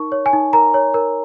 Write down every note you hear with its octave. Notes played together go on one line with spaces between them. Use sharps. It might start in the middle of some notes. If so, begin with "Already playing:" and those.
Already playing: D#4 A#4 C#6
C#5
G#5
D#4
A#4 A#5
C#5
A#4